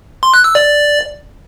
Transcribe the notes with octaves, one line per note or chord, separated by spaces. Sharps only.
C6
F#6
E6
D5